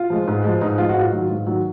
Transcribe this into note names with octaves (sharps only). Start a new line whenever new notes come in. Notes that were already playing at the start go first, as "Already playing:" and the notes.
Already playing: F4
F3 G#3
G#2
F3 G#3
G#2 D#4
F3 G#3 F4
F#4
G#2 F4
D#3 F#3
G#2
D#3 F#3